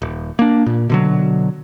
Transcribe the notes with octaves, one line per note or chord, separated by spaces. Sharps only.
D#1
A#3 D4
A#2
B2 D3 F#3